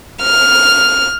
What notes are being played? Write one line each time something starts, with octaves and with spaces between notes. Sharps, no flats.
F6